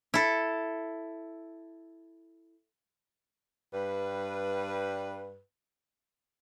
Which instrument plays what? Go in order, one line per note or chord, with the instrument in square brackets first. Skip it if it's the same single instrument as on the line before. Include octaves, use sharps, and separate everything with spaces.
[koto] E4 A4
[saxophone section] G2 G3 B4